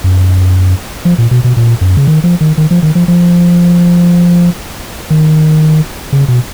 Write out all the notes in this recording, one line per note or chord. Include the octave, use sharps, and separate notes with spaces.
F#2
F3
A#2
B2
B2
A#2
F#2
C#3
D#3
F3
D#3
D#3
F3
D#3
F3
F3
D#3
C#3
B2